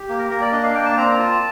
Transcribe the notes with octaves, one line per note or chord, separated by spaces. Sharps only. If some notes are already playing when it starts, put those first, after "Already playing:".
Already playing: G4
A#3
A#4
A#3 A#4
D5
D4 D#5
F5
A#3 G5
A5
C4 A#5
A#5
F4 A5